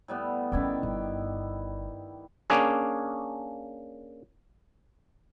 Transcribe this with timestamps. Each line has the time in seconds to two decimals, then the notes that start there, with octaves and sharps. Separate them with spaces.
0.08 A2 G3 B3
0.52 G1 D#3 C#4 E4 D5
0.83 G1
2.50 A#3 C#4 D4 G#4